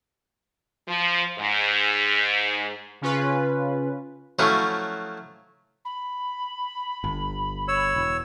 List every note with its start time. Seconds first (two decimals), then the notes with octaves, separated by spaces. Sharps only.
0.87 F3
1.38 G#2
3.01 C#3 C#4 F4 B4
4.39 F3 F#3 A3 C#4 E4 F#4
5.85 B5
7.04 G1
7.68 C#5 E6
7.96 E1